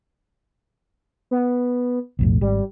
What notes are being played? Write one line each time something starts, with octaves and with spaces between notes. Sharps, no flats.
B3
B1 F2 A2
G#1 G3